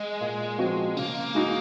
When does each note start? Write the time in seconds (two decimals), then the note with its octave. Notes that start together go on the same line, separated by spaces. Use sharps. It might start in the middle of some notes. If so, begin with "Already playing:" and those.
Already playing: G#3
0.21 A#2
0.58 F3 C4 F#4
0.96 C#3 A#3
1.35 G#3 D#4 F#4